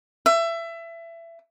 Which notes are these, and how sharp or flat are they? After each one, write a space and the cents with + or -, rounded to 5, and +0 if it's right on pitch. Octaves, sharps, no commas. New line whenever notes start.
E5 +25